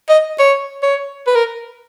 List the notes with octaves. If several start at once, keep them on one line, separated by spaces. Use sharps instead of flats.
D#5
C#5
C#5
B4
A#4